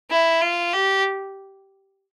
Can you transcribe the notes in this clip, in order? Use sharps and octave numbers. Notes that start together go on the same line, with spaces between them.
E4
F4
G4